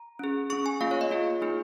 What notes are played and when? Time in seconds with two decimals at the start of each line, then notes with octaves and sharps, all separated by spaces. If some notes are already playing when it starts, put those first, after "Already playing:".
Already playing: A#5
0.19 C#4 G#4
0.50 C#4 G#4 C#6
0.66 G#5
0.81 A#3 F4 G#4 F5
0.91 C#5
1.01 D#5
1.10 A#3 F4 G#4
1.41 A#3 D#4 G#4